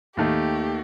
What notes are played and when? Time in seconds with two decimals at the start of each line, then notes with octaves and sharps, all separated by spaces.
0.17 D#2 D#3 A3 G4